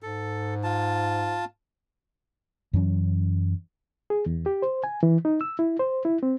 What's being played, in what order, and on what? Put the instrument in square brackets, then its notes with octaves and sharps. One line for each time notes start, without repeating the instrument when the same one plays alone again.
[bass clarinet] G#2 [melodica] A4
[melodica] F4 A5
[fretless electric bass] F#2 E3 F#3 C#4
[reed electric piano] G#4
E2
G4
C5
G#5
E3
D#4
E6
E4
C5
E4
C4